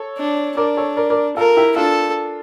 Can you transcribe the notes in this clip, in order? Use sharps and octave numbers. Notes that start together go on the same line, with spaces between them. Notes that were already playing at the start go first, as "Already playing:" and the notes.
Already playing: A4 C#5
D4
D4 A#4 D5
A4 C#5
A#4 D5
A#4 D5
F4 A4 A#4
E4 G4
D4 F4 A4